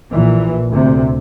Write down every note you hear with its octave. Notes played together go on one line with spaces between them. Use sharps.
A#1 A#2 E3
D2 C3